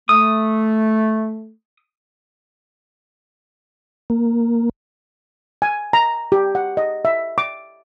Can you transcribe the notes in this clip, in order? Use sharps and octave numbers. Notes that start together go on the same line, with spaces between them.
A3 D#6
A#3
G#5
A#5
G4
F#5
D#5
E5
D6